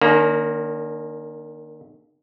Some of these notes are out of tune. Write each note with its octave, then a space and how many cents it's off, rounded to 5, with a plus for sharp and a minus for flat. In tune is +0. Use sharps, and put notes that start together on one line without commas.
D#3 -35 A#3 +0 C#4 +35